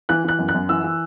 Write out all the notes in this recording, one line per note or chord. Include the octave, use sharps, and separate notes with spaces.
E3 F#6
E3 F#6
F#2
F#6
F#2
E3 E6
E3